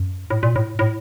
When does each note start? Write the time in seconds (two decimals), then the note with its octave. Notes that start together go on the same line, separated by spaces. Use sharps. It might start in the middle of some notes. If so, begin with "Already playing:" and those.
Already playing: F#2
0.30 A2
0.43 A#2
0.56 A2
0.79 A2